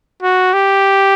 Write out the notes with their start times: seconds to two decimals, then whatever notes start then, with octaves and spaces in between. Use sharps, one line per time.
0.23 F#4
0.54 G4